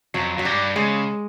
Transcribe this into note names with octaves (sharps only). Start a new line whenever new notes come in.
F2 F#3
F#2 F#3
G2 G3
C#3 G#3